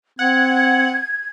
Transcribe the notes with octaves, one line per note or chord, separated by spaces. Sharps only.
C4 F#5 G#6